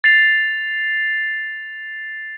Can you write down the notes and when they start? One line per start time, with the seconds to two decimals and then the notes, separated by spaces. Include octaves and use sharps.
0.04 A6 C7 F7